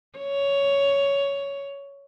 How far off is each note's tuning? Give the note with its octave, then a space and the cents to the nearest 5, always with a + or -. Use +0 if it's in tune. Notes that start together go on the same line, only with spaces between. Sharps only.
C#5 +10